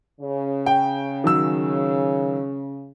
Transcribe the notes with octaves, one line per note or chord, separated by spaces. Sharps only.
C#3
G5
D#3 F#3 E6